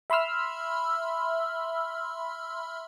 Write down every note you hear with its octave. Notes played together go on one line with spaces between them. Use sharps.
E5 B5 C6 E6 F6